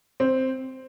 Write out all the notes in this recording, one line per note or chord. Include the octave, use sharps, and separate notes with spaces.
C4